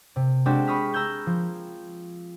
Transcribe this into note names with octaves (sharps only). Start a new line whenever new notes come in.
C3
G#3 C4 D4 F#4 G4
B5 C#6 D#6 F6 B6
A#5 E6 F6 G6 G#6
F3